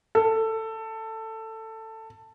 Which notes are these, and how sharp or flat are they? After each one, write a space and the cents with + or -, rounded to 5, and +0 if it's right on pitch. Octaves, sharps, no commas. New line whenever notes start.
A4 +15